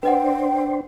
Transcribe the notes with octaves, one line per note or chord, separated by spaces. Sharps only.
D4 B4 C5 D#5 F#5 G5